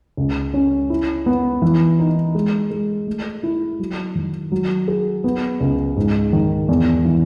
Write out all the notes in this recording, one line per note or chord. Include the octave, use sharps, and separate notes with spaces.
C#2
C#4
E4
B3
E3
D#4
G#3
G#3
A3
E4
F#3
D#3
F#3
G#4
B3
C#2
G#2
D#3
E2
E3